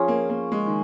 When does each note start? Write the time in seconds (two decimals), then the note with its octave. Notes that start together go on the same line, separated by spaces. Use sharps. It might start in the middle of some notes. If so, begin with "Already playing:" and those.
Already playing: F3 C#4 F4 G#4
0.08 A#3
0.30 A#3
0.52 G#3
0.67 D#3